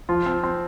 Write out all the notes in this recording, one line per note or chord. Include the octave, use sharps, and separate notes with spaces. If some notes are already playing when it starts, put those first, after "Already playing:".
F3 F4
C4
C4